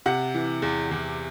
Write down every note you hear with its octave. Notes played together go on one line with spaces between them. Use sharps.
C3 F#5
E3
E2
E2